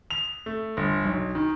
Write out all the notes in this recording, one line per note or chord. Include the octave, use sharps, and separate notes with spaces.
F7
A3
G1
B1
D#3